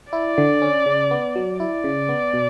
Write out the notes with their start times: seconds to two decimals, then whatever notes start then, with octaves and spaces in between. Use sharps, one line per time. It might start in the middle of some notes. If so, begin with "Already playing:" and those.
0.13 E4 D5
0.38 D3
0.62 C#4
0.86 C#3
1.11 B3
1.36 F#3
1.60 E4 D5
1.84 C#3
2.09 B3
2.33 B2